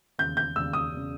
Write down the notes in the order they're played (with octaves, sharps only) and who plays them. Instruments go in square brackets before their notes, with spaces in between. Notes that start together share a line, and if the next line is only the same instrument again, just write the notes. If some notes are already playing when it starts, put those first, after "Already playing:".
[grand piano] E1 D#2 C#3 [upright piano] G6
[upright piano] G6
[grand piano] E1 D#2 C#3 [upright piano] E6
[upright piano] D#6
[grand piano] E1
C#3